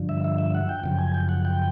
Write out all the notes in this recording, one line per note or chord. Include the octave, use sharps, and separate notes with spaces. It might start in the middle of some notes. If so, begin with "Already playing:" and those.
Already playing: G2 D3 F3
E5
E5
E5
F#5
G5
F#2 C#3 F3 G5
G#5
G5
F#5
G5